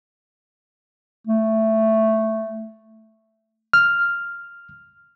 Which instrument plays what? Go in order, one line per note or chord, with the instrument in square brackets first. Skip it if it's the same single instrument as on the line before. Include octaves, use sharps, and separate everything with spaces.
[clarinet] A3
[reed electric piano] F6